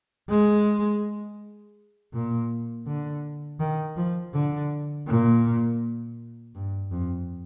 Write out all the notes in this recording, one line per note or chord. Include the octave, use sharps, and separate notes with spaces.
G#3
A#2
D3
D#3
F3
D3
A#2
G2
F2